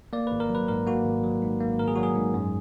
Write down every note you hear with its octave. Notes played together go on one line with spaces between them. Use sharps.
A#3 D5
G#1 B4
A#4
F#3
B4
G#2 A#4
A#3 F#4
G#1
F#3
G#2
A#3
G#1 A#4
G#4
F#3 F#4
G#4
G#2
F#2